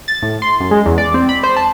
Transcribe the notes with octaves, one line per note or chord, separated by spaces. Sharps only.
A6
A2
C6
F#2
G#3
E2
D5
C4
B5
C5
A5